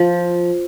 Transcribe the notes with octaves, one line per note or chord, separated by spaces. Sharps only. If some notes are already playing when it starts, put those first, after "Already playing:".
Already playing: F3